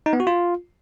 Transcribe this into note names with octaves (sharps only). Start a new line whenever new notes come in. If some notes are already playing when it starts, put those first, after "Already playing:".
D#4
B3
F#4
F4